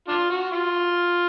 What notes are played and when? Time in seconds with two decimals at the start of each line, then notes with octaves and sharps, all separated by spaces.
0.08 D4 F4
0.30 F#4
0.52 F4